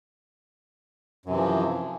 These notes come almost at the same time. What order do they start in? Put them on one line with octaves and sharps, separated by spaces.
F#2 C3 E3 F3